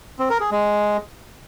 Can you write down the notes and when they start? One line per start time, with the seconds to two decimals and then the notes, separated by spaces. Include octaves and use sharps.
0.19 C4
0.30 A#4
0.40 G#4
0.51 G#3